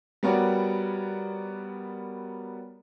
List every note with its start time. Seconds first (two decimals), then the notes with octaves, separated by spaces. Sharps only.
0.23 G3 B3 F#4 A#4 C#5 D5